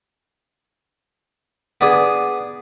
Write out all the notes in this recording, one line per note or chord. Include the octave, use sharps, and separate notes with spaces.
B3 D4 G#4